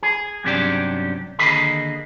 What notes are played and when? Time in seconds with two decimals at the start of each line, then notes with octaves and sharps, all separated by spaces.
0.03 G#4
0.44 G2 C3 F#3 C#4 D4 G4
1.39 D#2 D3 G#4 A#4 D#5 B5